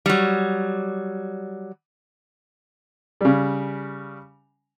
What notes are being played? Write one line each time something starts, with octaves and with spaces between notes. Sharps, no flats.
F#3 G3
C#3 G3